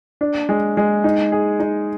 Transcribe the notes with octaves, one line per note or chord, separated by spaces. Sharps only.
D4
G#3
G#3
D#4
G#4
D#4